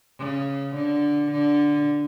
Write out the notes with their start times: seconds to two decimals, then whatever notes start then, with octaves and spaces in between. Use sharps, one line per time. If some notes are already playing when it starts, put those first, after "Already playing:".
0.19 C#3
0.75 D3
1.31 D3